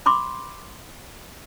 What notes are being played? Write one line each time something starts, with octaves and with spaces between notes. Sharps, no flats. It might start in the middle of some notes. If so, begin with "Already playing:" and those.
B5 C6 D6